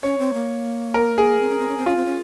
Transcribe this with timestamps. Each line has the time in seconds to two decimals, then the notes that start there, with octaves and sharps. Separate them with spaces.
0.03 C#4 C#5
0.18 C4
0.34 A#3
0.94 A#4
1.18 G#4
1.40 C4
1.49 C#4
1.59 C4
1.68 C#4
1.77 C4
1.86 C#4 F4
1.96 C4
2.06 C#4